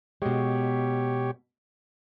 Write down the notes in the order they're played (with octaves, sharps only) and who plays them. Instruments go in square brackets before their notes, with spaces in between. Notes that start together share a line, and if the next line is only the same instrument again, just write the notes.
[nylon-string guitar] B2 G#3 [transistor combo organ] G4 C#5